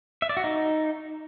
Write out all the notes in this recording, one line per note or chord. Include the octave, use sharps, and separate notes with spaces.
E5
D5
F#4
D#4